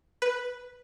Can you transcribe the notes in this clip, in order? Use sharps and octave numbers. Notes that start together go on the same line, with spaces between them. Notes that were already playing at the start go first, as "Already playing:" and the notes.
B4